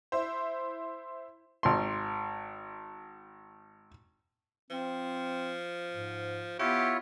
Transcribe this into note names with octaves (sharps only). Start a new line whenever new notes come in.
E4 C5
G#1 C6
F3 C4
G#2
B3 E4 F4 G4 C#5